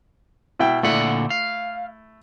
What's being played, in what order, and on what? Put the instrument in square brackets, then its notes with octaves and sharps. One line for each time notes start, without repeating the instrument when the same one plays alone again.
[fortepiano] B2 E4 G5
[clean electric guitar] A#2 D3 F#5 [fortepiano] A3 E4
[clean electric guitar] F5